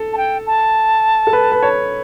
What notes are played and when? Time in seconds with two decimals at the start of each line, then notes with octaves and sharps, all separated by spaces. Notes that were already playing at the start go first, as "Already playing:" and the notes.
Already playing: A4
0.13 A5
0.17 G5
0.46 A5
1.27 A4
1.33 B4
1.52 B4
1.63 C#5